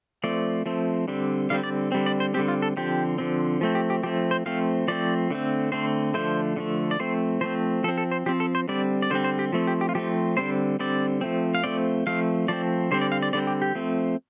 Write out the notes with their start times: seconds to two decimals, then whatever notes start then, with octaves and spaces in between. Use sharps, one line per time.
0.24 F3 A3 C4 D5
0.66 F3 A3 C4
1.08 D3 G3 C4
1.50 D3 G3 C4 F5
1.63 D5
1.92 D3 G3 C4
2.06 D5
2.20 C5
2.34 D3 G3 C4 G4
2.48 F4
2.62 A4
2.77 D3 F3 C4 G4
3.18 D3 F3 C4
3.61 F3 A3 C4
3.75 G4
3.90 G4
4.03 F3 A3 C4 G4
4.31 C5
4.46 F3 A3 C4 F5
4.88 F3 A3 C4 D5
5.31 D3 A3 C4
5.72 D3 A3 C4 C5
6.14 D3 F3 A3 C5
6.56 D3 F3 A3
6.91 D5
6.99 F3 A3 C4 C5
7.41 F3 A3 C4 C5
7.84 F3 A4
7.88 C4
7.98 A4
8.12 C5
8.26 F3 C4 G4
8.40 A4
8.55 C5
8.68 D3 G3 C4 D5
9.02 D5
9.10 D3 G3 C4 C5
9.24 C5
9.39 G4
9.53 F3 A3 C4
9.67 G4
9.81 G4
9.89 F4
9.95 F3 A3 C4 G4
10.37 D3 G3 C4 C5
10.79 D3 G3 C4 D5
11.21 F3 A3 C4
11.55 F5
11.64 F3 A3 C4 D5
12.07 F3 A3 C4 F5
12.48 F3 A3 C4 D5
12.91 D3 G3 C4 C5
13.01 D5
13.12 F5
13.22 D5
13.33 D3 G3 C4 D5
13.47 G4
13.62 G4
13.75 F3 A3 C4